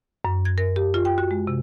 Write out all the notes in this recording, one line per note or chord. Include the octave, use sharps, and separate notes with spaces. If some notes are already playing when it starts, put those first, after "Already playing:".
F#2
G#6
A#4
G4
F4
G5
F#4
G#3
C3